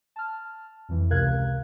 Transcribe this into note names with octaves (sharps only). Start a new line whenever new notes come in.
A5 F6
F2 E3
C#2 C3 A#4 F5 F#6 G#6